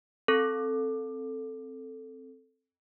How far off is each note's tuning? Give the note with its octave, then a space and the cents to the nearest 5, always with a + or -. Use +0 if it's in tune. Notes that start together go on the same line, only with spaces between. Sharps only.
C4 +0 A4 +0